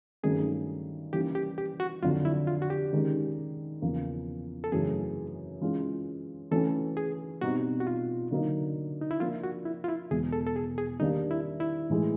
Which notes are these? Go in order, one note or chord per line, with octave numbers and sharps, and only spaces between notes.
G2 D#3 F#3 A3 C#4 G#4
E3 G3 A#3 C#4 E4 G4
G4
G4
F#4
F2 D3 F#3 F4
E4
F4
F#4
G4
D#3 G#3 C#4
E2 C#3 F3 A#3
A4
F#2 C#3 E3 A3 G#4
E3 G#3 C#4 F4
E3 A3 C#4 F#4 A4
G#4
B2 G3 C4 D#4 F#4
F#4
F4
D3 F#3 A#3 D#4
D#4
E4
F3 A#3 D4 F4
F#4
E4
F4
E4
E2 B2 G#3 G#4
A4
A4
G#4
G#4
D#3 G3 A#3 D4 D#4 G4
E4
E4
A2 E3 G#3